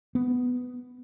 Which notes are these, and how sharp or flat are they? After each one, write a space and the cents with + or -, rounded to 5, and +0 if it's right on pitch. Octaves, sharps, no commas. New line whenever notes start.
B3 +5